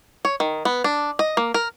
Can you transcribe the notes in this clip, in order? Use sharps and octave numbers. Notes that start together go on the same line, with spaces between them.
C#5
D#3
B3
D4
D#5
A#3
A#4